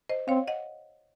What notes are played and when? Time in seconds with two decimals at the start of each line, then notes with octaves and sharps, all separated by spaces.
0.10 C5 D#5
0.28 C4 C#5 F5
0.48 D#5 F#5